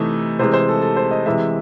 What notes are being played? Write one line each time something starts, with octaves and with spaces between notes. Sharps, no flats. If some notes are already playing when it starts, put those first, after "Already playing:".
Already playing: C3 E3 A3 D#4
C3 E3 G#3 C5
C5
A4
A4
C5
D#5
C3 E3 G#3 E5